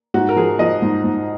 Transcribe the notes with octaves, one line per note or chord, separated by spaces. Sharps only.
G#2 F#4
A#4
F3 G#4
F3 D#5
G#2
G#2